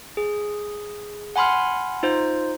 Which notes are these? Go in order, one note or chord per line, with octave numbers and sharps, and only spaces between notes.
G#4
F#5 G#5 B5 C6 F6
D#4 F4 C5